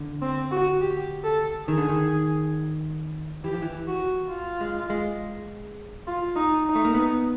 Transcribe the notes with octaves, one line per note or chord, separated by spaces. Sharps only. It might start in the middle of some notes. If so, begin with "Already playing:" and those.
Already playing: D3
C4
F#4
G4
A4
D#3 G#4
D3
D#3
E3 G4
F3
E3
F#4
F4
G#3
G#3
F4
D#4
D#4
A3
A#3
B3